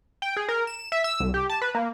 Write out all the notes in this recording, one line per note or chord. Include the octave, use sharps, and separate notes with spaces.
G5
G#4
A#4
E7
E5
E6
C2
G4
A5
B4
A#3